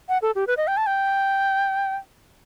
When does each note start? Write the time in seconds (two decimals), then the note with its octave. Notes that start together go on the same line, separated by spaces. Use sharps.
0.09 F#5
0.22 A4
0.35 G4
0.47 B4
0.57 D#5
0.67 G5
0.77 A5
0.87 G5